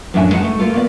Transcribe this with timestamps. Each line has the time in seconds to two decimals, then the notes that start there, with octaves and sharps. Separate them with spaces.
0.14 F#2 A2 F3 D4 E5 G#5
0.32 G#3 D#4 F#5 A5
0.44 A3
0.59 A3 A#3 F4 A4
0.74 A#3 B3 D5